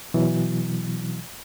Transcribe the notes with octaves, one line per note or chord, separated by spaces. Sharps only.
B2 E3 F#3